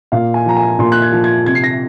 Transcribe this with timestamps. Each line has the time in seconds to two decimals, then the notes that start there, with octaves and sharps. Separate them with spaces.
0.12 A#2 F5
0.34 G#5
0.46 F3 A#5
0.57 G#5
0.79 A#2 C6
0.92 F#6
1.02 G#6
1.13 F3
1.24 G#6
1.46 C3 G#6
1.55 C7
1.64 A#6